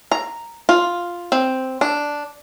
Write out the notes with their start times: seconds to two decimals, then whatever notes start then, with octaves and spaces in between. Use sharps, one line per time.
0.12 A#5
0.69 F4
1.32 C4
1.81 D4